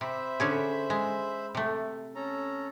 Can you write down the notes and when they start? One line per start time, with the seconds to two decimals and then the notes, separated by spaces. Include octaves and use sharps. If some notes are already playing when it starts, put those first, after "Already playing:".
0.01 C3 C5 E5 B5
0.40 D3 C#4 G#4
0.90 G#3
1.55 C3 A3
2.15 C#4 A4 A#5